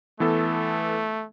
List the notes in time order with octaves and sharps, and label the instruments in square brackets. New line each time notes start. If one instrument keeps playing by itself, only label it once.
[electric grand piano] E3 B3 A4 [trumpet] A3